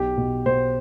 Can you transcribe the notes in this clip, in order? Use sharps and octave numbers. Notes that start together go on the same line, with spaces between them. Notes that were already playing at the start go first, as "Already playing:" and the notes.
Already playing: B1 G4
B2
B2 C5